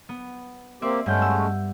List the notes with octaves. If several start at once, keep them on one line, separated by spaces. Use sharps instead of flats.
B3
A#3 C4 G4 D5 E5 C6
G2 G#3 A3 C#4 F#5 G6
E6